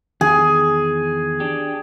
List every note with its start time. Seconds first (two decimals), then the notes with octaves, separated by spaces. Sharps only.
0.21 E2 D#3 G#4
1.40 D4 G4